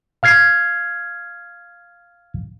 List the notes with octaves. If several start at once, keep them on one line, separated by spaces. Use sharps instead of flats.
F5 F6 G#6 C7